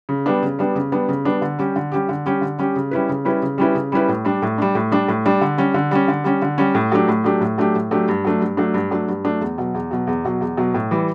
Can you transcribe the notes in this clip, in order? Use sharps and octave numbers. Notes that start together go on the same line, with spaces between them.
C#3
G3 B3 D4
C#3
G3 B3 D4
C#3
G3 B3 D4
C#3
G3 B3 D4
D3
G3 C#4 G4
D3
G3 C#4 G4
D3
G3 C#4 G4
D3
G3 C#4 G4
C#3
G3 C#4 E4 B4
C#3
G3 C#4 E4 B4
C#3
G3 C#4 E4 B4
C#3
G3 C#4 E4 B4
A2
G3 D4
A2
G3 D4
A2
G3 D4
A2
G3 D4
D3
G3 C#4
D3
G3 C#4
D3
G3 C#4
D3
G3 C#4
A2
F#3 A3 D4 G4
A2
F#3 A3 D4 G4
A2
F#3 A3 D4 G4
A2
F#3 A3 D4 G4
G2
F#3 A3 D4
G2
F#3 A3 D4
G2
F#3 A3 D4
G2
F#3 A3 D4
E2
B2 F#3
E2
B2 F#3
E2
B2 F#3
E2
B2 F#3
A2
E3 G3